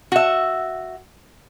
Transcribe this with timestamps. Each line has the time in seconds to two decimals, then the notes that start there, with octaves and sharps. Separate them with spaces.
0.12 F#4 E5